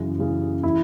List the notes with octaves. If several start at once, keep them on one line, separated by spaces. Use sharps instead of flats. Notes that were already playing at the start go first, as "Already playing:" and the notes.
Already playing: F#2 C#3 E3
F#2 C#3 E3
E3 E4